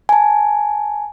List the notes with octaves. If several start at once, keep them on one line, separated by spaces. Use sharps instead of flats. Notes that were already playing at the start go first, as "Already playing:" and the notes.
G#5 A5